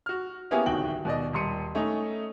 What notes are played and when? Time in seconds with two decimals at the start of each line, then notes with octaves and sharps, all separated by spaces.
0.06 F#4 F6
0.51 A#3 B3 C#4 E4 G4 G#4
0.66 D1 C2 D#3 F#4 G5 F#7
1.05 D#2 B2 D5 D#5
1.33 D#1 G3 C6 C#7 D#7
1.75 A3 C#4 D#4